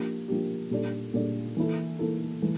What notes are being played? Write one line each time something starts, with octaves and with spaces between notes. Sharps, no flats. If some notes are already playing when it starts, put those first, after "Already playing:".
Already playing: F3 A#3 D4 G4
F3 A#3 D4 G4
A#2 G3 D4 A4 D5
A#2 G3 D4 A4 D5
E3 A#3 E4 A4
E3 A#3 E4 A4
E3 A3